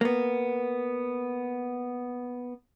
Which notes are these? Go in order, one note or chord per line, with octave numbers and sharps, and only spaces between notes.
A#3 B3